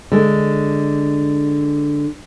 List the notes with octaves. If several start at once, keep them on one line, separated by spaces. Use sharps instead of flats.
D3 G#3